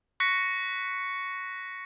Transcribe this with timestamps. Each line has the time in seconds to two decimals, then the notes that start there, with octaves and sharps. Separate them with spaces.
0.20 C#6 F#6 A#6 B6 C#7